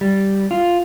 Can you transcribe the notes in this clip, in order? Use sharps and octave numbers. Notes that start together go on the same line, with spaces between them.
G3
F4